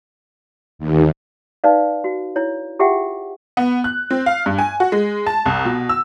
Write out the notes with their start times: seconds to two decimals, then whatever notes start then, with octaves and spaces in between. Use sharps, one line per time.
0.79 D#2
1.64 D#4 B4 D5 F5
2.04 F#4
2.36 E4 C#5
2.79 F4 G4 G#4 E5 F#5 G5
3.57 B3
3.84 F#6
4.11 C4
4.26 F5
4.46 G2
4.59 G#5
4.80 F#4
4.92 G#3
5.26 A5
5.46 C2
5.65 B2
5.89 E6